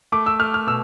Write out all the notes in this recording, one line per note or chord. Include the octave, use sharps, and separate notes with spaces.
A3 D6
E6
A3 F6
F6
B2 E6